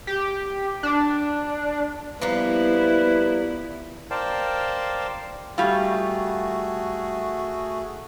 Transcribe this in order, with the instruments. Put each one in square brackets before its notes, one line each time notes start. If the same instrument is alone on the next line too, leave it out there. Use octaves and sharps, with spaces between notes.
[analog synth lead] G4
D4
[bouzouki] F3 G3 A#3 [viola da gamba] B3 E4 [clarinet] B4
[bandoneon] A#4 C5 D5 F5 G5 A5
[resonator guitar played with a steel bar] G3 F4 [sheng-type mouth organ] A3 F#4 G#4